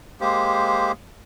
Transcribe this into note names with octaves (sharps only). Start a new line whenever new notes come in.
G#3 A#3 G4 C5